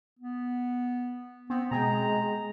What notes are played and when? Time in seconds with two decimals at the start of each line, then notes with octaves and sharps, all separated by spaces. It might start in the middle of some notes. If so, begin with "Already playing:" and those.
0.19 B3
1.50 B3 C4
1.71 B2 G#3 G#4 G5 A#5